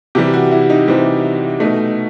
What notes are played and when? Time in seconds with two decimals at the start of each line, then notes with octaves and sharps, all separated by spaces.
0.15 C3 E3 G3 G4
0.34 F#4
0.51 E4
0.70 D#4
0.88 C3 E3 G3 C4
1.60 B2 A3 D#4